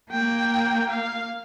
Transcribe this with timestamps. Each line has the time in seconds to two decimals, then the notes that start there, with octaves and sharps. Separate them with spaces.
0.11 A#3 G5
0.89 F5